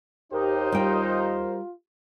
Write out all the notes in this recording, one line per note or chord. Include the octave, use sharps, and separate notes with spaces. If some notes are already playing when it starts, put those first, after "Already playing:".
D#2 D#4 G4 A#4 C5
G3 F4 G5